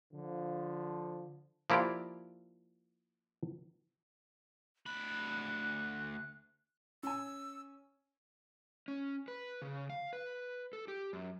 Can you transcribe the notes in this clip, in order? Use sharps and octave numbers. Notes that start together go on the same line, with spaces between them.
D3 F3
F3 A#3 E4 F4 G4 D5
D2 B5 F#6
C#4 G#5 E6
C#4
B4
C#3
F5
B4
A4
G4
F#2